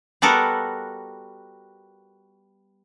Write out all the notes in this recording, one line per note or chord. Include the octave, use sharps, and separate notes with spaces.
G3 B3 F#4 A4 A#4